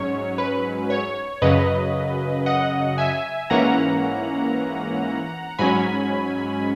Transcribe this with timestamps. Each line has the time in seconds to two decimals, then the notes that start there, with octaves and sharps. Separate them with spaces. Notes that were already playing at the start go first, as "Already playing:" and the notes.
Already playing: G#2 F#3 C#4 C#5
0.38 B4
0.90 C#5
1.42 F#2 C#3 F#3 B4 D#5
2.46 D#5 F#5
2.98 E5 G#5
3.50 G#2 E3 A#3 C#4 F#5 A#5
5.59 G#2 F#3 C#4 G#5 B5